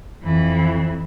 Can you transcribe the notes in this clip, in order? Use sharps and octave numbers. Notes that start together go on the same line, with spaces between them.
F2 E3